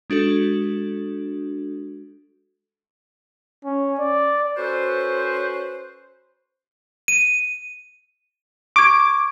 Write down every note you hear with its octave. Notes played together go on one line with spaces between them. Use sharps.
G#3 D4 F#4 A4
C#4
D5
C#4 F#4 A4 B4 C5
D#7
C#6 D6 G#6